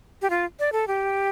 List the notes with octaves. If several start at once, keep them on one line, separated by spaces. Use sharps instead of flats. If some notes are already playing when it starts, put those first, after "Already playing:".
G4
F4
D5
A4
G4